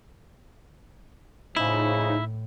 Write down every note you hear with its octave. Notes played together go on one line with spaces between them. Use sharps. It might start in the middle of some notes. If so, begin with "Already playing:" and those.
A2 C#3 F3 D#4 E4